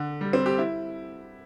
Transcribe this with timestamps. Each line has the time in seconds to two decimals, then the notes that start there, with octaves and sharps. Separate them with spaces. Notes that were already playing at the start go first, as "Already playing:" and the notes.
Already playing: D3
0.21 G3
0.33 C4
0.46 G4
0.58 E4